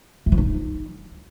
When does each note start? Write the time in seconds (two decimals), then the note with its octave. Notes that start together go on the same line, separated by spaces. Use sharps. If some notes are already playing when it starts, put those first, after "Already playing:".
0.26 A3
0.32 F3
0.38 D#4